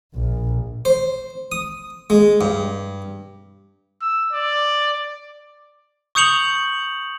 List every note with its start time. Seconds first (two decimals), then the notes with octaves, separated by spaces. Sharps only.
0.14 A#1
0.85 C5
1.52 D#6
2.10 G#3
2.41 G2
4.02 E6
4.33 D5
6.15 C#6 D#6 G6 C#7 F7 F#7